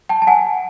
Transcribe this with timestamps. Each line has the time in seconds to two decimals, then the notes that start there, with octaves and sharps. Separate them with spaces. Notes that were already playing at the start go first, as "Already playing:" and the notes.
0.09 G5 A5
0.22 A5
0.27 F#5 G#5